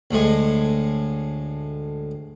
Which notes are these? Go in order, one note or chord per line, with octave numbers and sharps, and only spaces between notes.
D2 A2 G#3